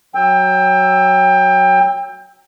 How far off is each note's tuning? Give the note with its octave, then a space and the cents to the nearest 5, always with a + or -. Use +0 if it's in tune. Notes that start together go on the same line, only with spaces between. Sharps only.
F#3 +0 G5 +25 E6 +0